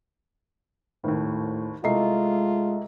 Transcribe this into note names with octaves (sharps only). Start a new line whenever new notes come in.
G#1 D#2 A2
C2 G#3 A3 F4 D#5 E5 A#5 C7